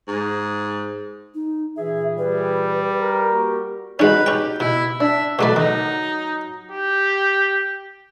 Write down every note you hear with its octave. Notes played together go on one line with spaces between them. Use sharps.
G#2
D#4
A#2 E3 G#4 E5
G3 B4
A#4
A#3 F#4 G4
G#3 C#4 D#4 F#4 B4
C#4 G4 G5
B2 E4
D4 E5
B2 F#3 A3 F#4 B4 D5
D#3 D#4
G4